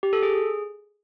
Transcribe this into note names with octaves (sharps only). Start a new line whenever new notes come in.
G4
A4
G#4